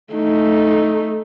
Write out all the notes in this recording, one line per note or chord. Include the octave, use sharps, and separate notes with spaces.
A3 D#4